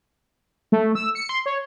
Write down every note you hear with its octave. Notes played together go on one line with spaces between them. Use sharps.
A3
E6
C#7
C6
C#5